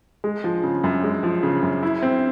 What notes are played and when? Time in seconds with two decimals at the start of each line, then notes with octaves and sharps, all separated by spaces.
0.24 G#3
0.44 F3
0.63 C#3
0.84 F#2
1.03 G#3
1.23 F3
1.43 C#3
1.63 F#2
1.83 E4
2.03 C4